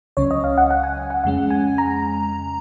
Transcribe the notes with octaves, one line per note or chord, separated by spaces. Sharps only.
C#2 C#3 F#3 C#4 C#5
D#5
F5
F#5
F#5
G#5
F#5
F2 C#3 G#3 C#4 F#5
G#5
A#5